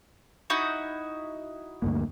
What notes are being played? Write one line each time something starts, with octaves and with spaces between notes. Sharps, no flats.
D#4 E4 F#4
D2 G2 A#3